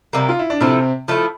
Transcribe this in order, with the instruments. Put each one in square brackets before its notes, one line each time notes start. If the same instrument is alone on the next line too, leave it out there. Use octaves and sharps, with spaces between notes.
[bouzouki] C3 G3 A#3
[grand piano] F4
E4
D4
[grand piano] C3 C4 [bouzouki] F3 A3 E4
[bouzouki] F3 A3 E4